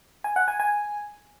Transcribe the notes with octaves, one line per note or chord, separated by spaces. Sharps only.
G#5
F#5
G#5
G#5